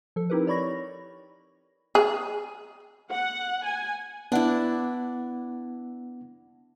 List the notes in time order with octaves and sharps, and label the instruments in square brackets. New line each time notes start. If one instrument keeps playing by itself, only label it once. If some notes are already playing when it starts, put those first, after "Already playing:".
[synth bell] F3 A4
C4 D#4 E4 G4 A#4 B4
C#5 D5 B5 C#6 A#6
[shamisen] G#4
[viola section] F#5
G#5
[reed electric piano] B3 F#5 [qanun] D4 E4